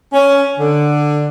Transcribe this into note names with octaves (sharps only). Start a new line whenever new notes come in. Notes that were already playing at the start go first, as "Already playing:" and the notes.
C#4
D3